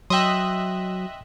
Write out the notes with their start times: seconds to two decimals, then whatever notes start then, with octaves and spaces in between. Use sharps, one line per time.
0.10 F#3 D#5 E5 G5 C6 F#6